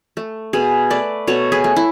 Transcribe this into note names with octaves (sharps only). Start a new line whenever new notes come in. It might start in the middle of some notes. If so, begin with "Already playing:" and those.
A3
B2 G#4 B4
A3 B4 D5
B2 A4 C#5
G#4 B4
A3
E4